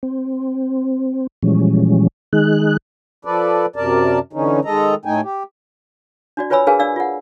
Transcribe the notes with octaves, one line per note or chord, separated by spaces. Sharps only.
C4
A#2 E3 F3 G3 G#3 C#4
D#3 G#3 D#4 G#4 F#6
F3 A4 B4 D5
F#2 C3 A#4 D5 A5
D3 E3 C#4 D#4
D#3 G#3 A4 D#5 A#5
A2 A3 D#4 G5 G#5
G4
D4 F#4 D5
F4 B4 C#5 G#5 B5 E6
D4 G#4 A#4 B4 F5 G#5
D4 D5 F5 E6
F4 F#5